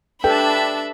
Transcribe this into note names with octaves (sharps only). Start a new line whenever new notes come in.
D4 G4 A4 B4 E5 G5 A5 B5